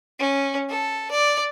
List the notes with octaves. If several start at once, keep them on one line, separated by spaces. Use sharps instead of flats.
C#4
A4
D5